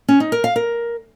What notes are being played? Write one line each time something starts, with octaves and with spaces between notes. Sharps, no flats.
C#4
D#4
A#4
F5
A#4